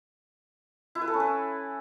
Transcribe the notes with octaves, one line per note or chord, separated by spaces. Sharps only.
E4
B4
A4
C#4
B4